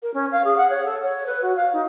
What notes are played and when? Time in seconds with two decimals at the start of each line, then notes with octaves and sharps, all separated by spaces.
0.03 A#4
0.14 C#4
0.32 F5
0.45 G#4
0.57 F#5
0.70 C#5
0.84 A4
1.03 C#5
1.26 B4
1.42 F#4
1.56 F5
1.73 D#4